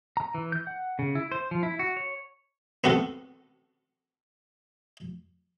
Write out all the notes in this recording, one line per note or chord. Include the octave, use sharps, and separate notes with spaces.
A#5
E3
G6
F#5
C#3
E4
C5
F3
E4
F#4
C#5
B3 C4 F#4 A4 F#5